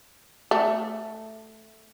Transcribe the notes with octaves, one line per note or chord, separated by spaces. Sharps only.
A3